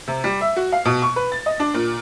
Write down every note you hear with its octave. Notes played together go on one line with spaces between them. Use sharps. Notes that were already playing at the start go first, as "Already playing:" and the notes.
C3
G3
E5
F#4
F5
B2
C#6
B4
A6
D#5
D4
A#2